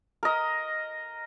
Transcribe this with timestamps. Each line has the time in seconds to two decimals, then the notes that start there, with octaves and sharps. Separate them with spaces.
0.23 A#4 D#5